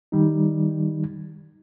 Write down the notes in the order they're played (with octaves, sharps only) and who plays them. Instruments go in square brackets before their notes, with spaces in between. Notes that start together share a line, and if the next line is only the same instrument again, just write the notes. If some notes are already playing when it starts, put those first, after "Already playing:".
[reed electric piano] D#3 G3 D#4